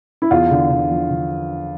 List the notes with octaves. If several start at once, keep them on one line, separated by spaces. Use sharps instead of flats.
E4
E2 F4
D3
D3
F3
D3